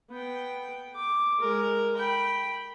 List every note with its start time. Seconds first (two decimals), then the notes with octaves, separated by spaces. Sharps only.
0.10 B3 G5
0.96 D6
1.40 G#3 A#4
1.97 G5 B5